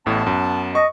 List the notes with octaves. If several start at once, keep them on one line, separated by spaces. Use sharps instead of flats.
A1 A2 B3 A5
F#2
D#5 C#6